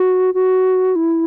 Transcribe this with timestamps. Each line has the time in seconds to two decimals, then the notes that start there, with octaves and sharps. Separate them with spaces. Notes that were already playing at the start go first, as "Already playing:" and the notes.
Already playing: F#4
0.34 F#4
0.96 E4